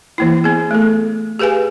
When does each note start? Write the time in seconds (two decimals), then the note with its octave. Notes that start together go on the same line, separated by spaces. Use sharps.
0.18 E3 A#3 E4
0.44 B3 G#4
0.71 A3 A4
1.39 G4 G#4 B4 F5 G#5